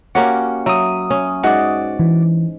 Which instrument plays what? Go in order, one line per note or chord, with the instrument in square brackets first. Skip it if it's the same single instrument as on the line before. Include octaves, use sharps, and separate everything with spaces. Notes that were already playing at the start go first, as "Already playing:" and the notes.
[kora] A#3 C#4 G4 [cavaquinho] F#4
[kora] F#3 [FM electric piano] E5 D#6
[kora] C#4
[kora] G#2 [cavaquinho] F#4 D5
[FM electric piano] E3